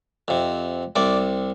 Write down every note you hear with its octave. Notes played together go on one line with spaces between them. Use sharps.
F2 C3
C2 C3 D5